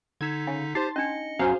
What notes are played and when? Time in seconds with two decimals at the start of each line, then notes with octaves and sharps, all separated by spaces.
0.21 D3 D#4 E6 G#6 B6
0.47 C#3
0.75 D#4 G4 C5 C6 A6
0.96 C#4 D4 D#5 C#7
1.39 F#2 G#4 C5 F5